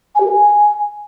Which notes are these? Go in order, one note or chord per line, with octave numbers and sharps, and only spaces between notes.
G#5
G4
A#4
G#5